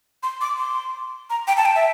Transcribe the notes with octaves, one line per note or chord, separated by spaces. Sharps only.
C6
D6
C6
A#5
G5
A5
G5
E5